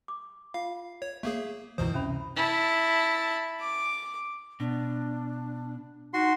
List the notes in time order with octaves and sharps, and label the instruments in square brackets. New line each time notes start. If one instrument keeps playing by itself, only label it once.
[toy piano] D6
[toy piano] F4 [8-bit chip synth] F5
[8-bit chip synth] C#5
A3 A#3 G#4
[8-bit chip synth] C#2 B2 C5 [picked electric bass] F#2 E3 [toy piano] E4 D#6
[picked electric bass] C3 [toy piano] C#4 E5 B5
[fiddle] E4 A5
D6
[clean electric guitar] B2 [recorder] D4
[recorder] D#4 [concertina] F#4 C6